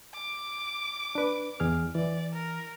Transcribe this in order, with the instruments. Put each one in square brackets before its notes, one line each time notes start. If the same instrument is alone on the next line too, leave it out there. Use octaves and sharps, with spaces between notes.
[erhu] D6
[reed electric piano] D4 B4
E2 G#4 F6
[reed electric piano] E3 [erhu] D5
[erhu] A#4